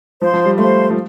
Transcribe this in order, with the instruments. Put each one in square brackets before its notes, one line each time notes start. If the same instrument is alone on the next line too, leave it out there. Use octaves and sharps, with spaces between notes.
[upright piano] F3 [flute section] C5 F5 C6
[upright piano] F3
G3
[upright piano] A3 [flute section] C5 F5 C6
[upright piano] F3